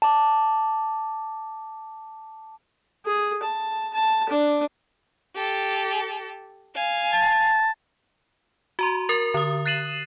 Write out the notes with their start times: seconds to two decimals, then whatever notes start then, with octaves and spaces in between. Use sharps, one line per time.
0.02 A5 D6
3.06 G#4
3.43 A5
3.94 A5
4.29 D4
5.35 G4 A4
6.75 F5 G#5
7.13 A5
8.79 F#4 A#5 C6
9.09 A#4 A6 F7
9.34 D3 D#6
9.66 F#6 A6 C7 D#7 E7 F#7